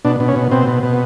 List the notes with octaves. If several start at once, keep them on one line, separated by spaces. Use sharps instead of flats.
B2 D4
B2
C#4
B2
B2 C4
B2
B2